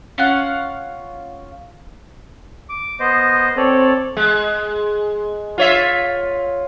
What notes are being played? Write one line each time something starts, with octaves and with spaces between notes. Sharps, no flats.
C#4 F4 F5 F#5
D6
B3 C5 D#5
C4 A4 C#5 D5
G#3
F4 C#5 E5